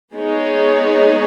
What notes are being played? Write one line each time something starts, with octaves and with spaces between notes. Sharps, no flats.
G#3 B3 D#4 G#4 C#5